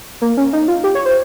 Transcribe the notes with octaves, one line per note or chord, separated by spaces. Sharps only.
A#3
C#4
D#4
F4
G4
C#5
C5